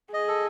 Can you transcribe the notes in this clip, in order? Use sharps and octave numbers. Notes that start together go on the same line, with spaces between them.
G#4 D#5
A4